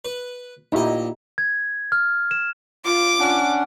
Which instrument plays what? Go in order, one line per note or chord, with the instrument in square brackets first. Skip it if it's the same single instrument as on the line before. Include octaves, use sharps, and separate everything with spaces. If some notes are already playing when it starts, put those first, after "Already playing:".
[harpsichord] B4
[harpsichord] A#1 D#5 [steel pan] D#4 E4 G4
[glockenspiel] G#6
F6
E7
[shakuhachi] F4 [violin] D6
[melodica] C#4 D4 F#5